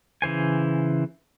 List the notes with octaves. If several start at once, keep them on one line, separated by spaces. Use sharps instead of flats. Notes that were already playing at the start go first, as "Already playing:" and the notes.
C#3 E3 C5 G#5